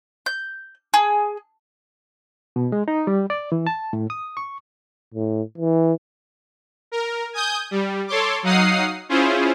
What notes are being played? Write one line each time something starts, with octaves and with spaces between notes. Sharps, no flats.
G6
G#4
B2
G#3
D#4
G3
D5
E3
A5
A2
D#6
C#6
A2
E3
A#4
G#5 D#6 G6
G3
A4 C#5 C6 D6
F#3 D#4 F5 F#5 D#6 C7
C#4 E4 F4 G#4 C5